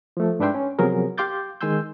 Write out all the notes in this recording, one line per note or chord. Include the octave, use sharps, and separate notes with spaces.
F3 A3
G#2 D4 B4 E5 G5 C6
C#4
C3 F3 F#3 B3 G#4 A#4
G4 F5 C6 D6 G6 A6
D#3 G#3 G#5 C6 E6 G6